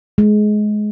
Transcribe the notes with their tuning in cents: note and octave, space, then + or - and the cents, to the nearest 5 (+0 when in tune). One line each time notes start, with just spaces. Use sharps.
G#3 +20